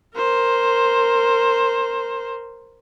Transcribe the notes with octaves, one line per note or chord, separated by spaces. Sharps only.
A#4 C5